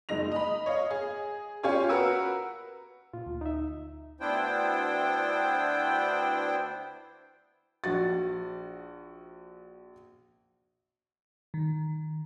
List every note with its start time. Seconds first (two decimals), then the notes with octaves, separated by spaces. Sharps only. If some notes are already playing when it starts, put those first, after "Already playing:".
0.09 F#1 G#3 D#4 A#6 F7
0.32 D#5 B5
0.66 C#5 D#5 F5
0.91 G#4
1.63 C#4 F4 G4 C#5 F5 G#5
1.89 F#4 A#4 B4 E6 C#7
3.13 A#2 F4
3.26 D2
3.41 D#4 E5
4.20 D2 B3 D4 E4 C5 G5
7.84 A#1 F#4 A6
11.54 D#3